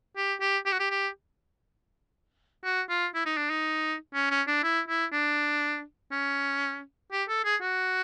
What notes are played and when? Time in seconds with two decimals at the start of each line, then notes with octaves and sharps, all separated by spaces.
0.17 G4
0.41 G4
0.66 G4
0.73 F#4
0.80 G4
0.91 G4
2.64 F#4
2.90 F4
3.15 E4
3.26 D#4
3.37 D4
3.50 D#4
4.14 C#4
4.31 C#4
4.47 D4
4.63 E4
4.89 E4
5.12 D4
6.12 C#4
7.12 G4
7.29 A4
7.45 G#4
7.62 F#4